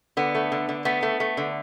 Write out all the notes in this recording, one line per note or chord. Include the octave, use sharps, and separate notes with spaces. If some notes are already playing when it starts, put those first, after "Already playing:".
D3 B3
A3
D3
D3
A3 B3
A3
A3
D3